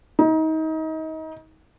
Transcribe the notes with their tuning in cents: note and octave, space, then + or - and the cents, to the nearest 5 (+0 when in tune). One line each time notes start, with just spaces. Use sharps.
D#4 +30